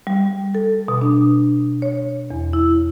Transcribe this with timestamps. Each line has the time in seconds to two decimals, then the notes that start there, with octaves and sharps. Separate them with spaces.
0.07 G3
0.55 A4
0.88 B2
1.02 D4
1.82 C#5
2.30 E2
2.53 E4